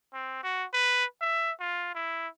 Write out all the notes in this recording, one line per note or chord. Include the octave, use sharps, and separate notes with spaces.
C4
F#4
B4
E5
F4
E4